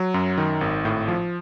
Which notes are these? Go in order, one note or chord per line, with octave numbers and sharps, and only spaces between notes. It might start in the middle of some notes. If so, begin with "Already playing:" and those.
Already playing: F#3
F#2
D#3
G#1
A2
F3